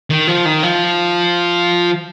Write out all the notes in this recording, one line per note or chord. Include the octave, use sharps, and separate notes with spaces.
D#3
F3
D#3
F3